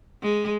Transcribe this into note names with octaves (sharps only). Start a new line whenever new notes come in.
G#3